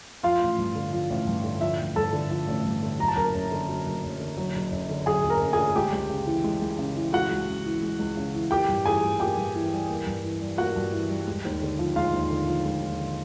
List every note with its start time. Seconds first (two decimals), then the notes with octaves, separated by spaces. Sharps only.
0.23 F3 F4 F5
0.41 A1
0.58 G2
0.75 D3
0.93 F3
1.10 A1
1.27 G2
1.44 D3
1.61 F3 E5
1.79 A1
1.96 G2 A4 A5
2.13 D3
2.31 F3
2.48 A1
2.66 G2
2.82 D3
2.99 F#3 A#5
3.08 A5
3.17 F#1 A#4 A#5
3.34 F#2
3.52 D3
3.69 F#3
3.85 F#1
4.03 F#2
4.20 D3
4.37 F#3
4.55 F#1
4.71 F#2
4.89 D3
5.06 F#3 G#4 G#5
5.24 F#1
5.30 A#4 A#5
5.41 F#2
5.53 G#4 G#5
5.58 D3
5.76 G#3 G4 G5
5.92 C#2
6.10 C#3
6.27 E3
6.44 G#3
6.61 C#2
6.79 C#3
6.96 E3
7.13 G#3 F#4 F#5
7.30 C#2
7.48 C#3
7.66 E3
7.83 G#3
7.99 C#2
8.17 C#3
8.34 E3
8.51 A#3 G4 G5
8.69 G2
8.86 E3 G#4 G#5
9.03 G3
9.20 A#3 G4 G5
9.37 G2
9.55 E3
9.72 G3
9.89 A#3
10.06 G2
10.24 E3
10.41 G3
10.58 A#3 F#4 F#5
10.76 G2
10.92 E3
11.09 G3
11.27 G#3
11.45 D#2
11.62 D3
11.79 F3
11.96 G#3 F4 F5
12.13 D#2
12.31 D3
12.47 F3
12.65 G#3
12.82 D#2
13.00 D3